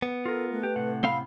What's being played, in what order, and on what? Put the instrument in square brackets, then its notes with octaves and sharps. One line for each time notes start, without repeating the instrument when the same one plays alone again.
[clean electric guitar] B3
[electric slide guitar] F4 A#4 [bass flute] A4
[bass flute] A3 [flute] B4
[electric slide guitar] G4
A2 C3 F#5
[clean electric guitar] C4 F5 [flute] B5